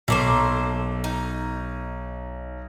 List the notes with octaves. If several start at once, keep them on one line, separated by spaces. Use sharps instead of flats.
B1 A3 A#3 C5
D#4